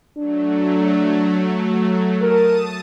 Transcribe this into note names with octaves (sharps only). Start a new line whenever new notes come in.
F#3 A3 D4
A#4 A5 D#6 D#7